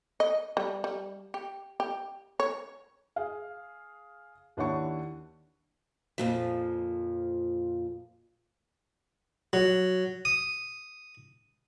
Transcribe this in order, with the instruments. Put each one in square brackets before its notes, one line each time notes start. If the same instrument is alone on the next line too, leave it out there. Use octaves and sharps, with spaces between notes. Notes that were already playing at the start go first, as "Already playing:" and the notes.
[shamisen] D#5
G3
G3
G4
G4
C#5
[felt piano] G#4 F5
D#2 D4 E4 C#5 F#5 C#6
[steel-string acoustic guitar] F2 A#2 F3
[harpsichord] F#3
D#6